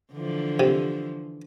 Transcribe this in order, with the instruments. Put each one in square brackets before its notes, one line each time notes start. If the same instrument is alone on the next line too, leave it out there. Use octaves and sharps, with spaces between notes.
[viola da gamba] D3 E3 F3
[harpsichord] C3